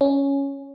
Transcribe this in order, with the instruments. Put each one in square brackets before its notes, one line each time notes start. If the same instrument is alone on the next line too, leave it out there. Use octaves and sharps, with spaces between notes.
[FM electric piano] C#4